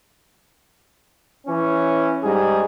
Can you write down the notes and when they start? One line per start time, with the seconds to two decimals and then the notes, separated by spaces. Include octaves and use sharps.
1.47 E3 C#4
2.24 G#2 G3 G#4